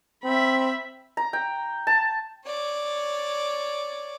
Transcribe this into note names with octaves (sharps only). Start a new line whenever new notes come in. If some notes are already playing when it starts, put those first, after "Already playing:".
C4 E5 B5
A#5
G5
A5
C#5 D5